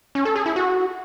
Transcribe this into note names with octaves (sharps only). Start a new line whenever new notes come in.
C#4
A4
G#4
E4
F#4